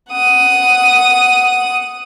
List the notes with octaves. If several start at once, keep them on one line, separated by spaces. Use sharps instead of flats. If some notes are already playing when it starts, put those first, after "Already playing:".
F#5 D#6